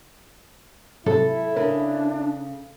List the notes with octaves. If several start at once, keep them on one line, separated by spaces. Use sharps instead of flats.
G#2 C3 F#3 E4 A4
C#3 D4 A#4